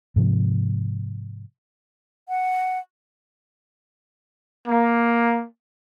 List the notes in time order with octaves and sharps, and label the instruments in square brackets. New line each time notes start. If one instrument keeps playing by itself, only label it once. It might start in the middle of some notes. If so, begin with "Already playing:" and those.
[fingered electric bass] G#2 C3 F3
[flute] F#5
[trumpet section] A#3